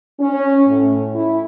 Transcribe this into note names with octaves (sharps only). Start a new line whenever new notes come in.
C#4
A2
E4